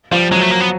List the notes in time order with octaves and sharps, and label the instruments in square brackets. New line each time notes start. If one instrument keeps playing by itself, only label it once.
[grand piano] F3 [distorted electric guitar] G3
[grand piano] F#3 [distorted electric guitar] G#3
[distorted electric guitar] A3
A#3
B3